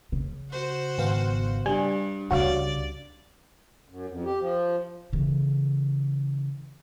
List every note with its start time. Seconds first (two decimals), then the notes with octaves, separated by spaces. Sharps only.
0.12 C#3
0.51 F#4 C5
0.98 G#1 B3 F5
1.66 G2 G3 G#5
2.31 C#2 C#3 F#4 C#5 D5 F5
3.90 F#2
4.10 F2
4.25 G4
4.40 F3
5.13 C#3 E3